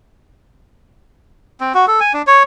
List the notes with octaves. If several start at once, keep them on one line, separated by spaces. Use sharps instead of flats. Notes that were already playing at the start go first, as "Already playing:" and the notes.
C4
F#4
A4
G#5
D4
C#5